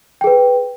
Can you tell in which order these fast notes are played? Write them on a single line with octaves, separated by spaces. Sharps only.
G5 G#4 B4